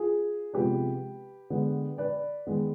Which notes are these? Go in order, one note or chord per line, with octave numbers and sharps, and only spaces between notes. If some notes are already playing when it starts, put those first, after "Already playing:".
Already playing: F4 G#4
C3 F3 G#3 B3 G4 B4
D3 G#3 B3
B4 D5
D#3 G#3 B3